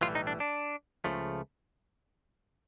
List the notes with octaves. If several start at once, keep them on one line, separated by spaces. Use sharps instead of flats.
B1 A2 E3 G3 F4
D#4
D4
D4
C#2 C#3 F3 A3